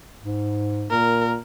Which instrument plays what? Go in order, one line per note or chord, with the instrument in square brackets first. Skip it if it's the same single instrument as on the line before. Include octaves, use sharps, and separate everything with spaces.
[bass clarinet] G#2
[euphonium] A#2 [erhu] A#4